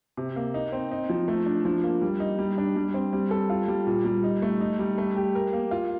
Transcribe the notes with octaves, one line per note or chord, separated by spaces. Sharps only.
C3
A#3
D#4
C4
D#4
F3
A3
D4
F3
A#3
G3
D#4
G3
D4
G3
C4
G3
A4
F4
G3
A#2
G3
D#4
A3
D#4
G3
A3
G4
A#4
A#3
F4